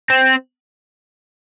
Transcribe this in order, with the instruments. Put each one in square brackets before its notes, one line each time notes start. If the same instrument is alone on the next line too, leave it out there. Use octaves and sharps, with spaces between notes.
[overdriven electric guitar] C4